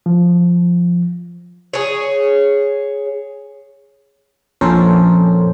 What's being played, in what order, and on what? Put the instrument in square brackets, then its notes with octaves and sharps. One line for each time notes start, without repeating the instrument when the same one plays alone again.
[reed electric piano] F3
[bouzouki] G#4 C#5
[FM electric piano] A#1 F2 C#4 A4 A#4 C5